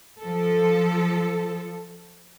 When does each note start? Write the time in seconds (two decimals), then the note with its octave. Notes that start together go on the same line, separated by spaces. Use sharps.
0.21 F3 A4